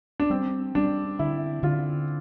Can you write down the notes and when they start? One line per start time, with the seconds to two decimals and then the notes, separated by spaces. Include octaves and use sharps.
0.20 D4
0.30 G3 C4
0.75 G3 D4
1.19 D3 E4
1.63 D3 F4